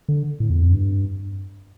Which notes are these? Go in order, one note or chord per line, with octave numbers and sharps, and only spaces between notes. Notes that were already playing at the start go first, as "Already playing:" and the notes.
D3
A2
E2
F2
G2